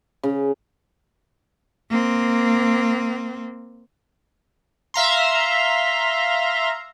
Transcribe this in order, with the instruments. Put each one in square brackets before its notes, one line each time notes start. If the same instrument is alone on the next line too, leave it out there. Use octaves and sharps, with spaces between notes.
[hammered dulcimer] C#3
[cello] A#3 C4
[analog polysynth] E5 F5 A#5 C6